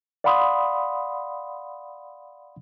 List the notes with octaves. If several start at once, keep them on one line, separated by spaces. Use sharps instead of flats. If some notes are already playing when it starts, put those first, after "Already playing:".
D5 F5 F#5 B5 C6 D#6